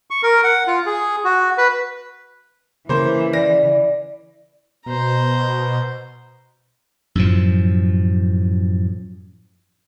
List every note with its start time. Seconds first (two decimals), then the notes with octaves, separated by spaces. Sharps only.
0.10 C#6
0.23 A#4
0.44 F#5
0.67 F4
0.86 G#4
1.24 F#4
1.58 B4
2.89 C#3 E3 A#3 C5
3.33 D5 A#6
4.86 B2 C5 A#5
7.15 F#2 A2 F3